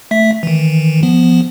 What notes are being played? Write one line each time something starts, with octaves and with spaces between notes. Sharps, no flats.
A3 E5 B6
D#3 E3
F3 B3